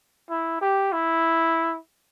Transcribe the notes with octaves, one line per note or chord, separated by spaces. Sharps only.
E4
G4
E4